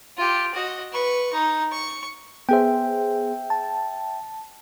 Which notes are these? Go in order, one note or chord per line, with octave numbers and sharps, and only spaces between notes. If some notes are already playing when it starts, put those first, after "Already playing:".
F4 G4
F#4 D#5
B4 C#6
D#4
C#6
B3 G#4 C5 E5 G5
A5